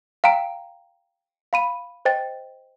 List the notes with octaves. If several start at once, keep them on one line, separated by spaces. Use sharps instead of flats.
F5 G5 A#5 D7
F5 B5 D#7
C5 D#5 G5 A6